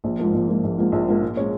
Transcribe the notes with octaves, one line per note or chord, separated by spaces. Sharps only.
A#1
G#2 F3 A#3
A#1
G#2 F3 A#3
A#1
G#2 F3 A#3
A#1
G#2 F3 A#3
A#2
G#3 C#4